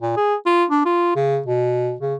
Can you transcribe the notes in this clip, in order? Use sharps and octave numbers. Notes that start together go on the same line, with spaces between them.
A#2
G#4
F4
D4
F4
C#3
B2
C#3